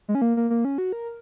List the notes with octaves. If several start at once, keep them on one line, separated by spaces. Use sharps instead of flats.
G#3
C#4
A#3
A#3
A#3
C#4
F#4
A#4